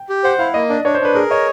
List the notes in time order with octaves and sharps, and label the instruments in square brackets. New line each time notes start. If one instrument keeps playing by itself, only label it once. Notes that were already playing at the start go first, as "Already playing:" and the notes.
Already playing: [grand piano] G5
[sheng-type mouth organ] G4
[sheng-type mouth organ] C5 [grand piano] F#5
[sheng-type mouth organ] E4 [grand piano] F5
[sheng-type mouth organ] A#3 [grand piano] D#5
[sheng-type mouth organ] D4 [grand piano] D5
[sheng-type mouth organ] D4 [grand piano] C#5
[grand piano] C5
[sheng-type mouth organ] D4 [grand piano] B4
[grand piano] G#4 [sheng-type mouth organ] A#4
[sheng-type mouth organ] C#5 [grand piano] D#5